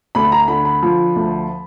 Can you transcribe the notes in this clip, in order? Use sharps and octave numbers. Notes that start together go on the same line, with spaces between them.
D2 B5
A#5
D3 B5
B5
F3
D2